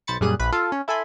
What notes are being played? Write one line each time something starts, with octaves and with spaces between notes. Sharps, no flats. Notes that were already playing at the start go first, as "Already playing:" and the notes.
B1 C5 B5 A6 C#7
F#2 A#2 G3 G#4 F#6 D#7
A#1 B4 B5
F4 A4 F5
C#4
E4 A4 G#5 B5 C6